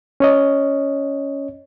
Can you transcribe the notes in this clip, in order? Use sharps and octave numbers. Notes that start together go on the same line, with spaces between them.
C#4 C#5 D#5